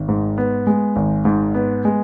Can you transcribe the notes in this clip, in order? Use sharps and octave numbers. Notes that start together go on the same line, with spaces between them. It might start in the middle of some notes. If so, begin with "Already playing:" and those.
Already playing: G#1
G#2
B3
G#3
G#1
G#2
B3
G#3